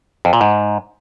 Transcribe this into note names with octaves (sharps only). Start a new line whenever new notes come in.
F2
A#2
G#2